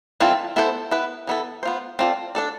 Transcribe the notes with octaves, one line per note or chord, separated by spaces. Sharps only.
E3 G3 C4 F4 A4
B3 E4 A4 C5
B3 E4 B4
E3 B3 E4 A4
B3 F4 C5
C4 F4 A4 D5
D4 A4 D5